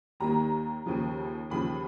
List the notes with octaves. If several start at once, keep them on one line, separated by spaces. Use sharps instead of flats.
D#2 D#3 G3 A#3 A#5
D#2 C#3 F3
D#2 C#3 F3 B5